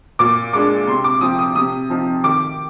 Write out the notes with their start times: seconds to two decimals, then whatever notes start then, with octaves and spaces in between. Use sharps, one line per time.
0.19 A#2 D6
0.53 G#3 D4 D6
0.87 C3 C6
1.04 D6
1.21 F3 C4 D#6
1.39 D#6
1.55 C3 D#6
1.90 F3 C4 D#4
2.24 D#3 D6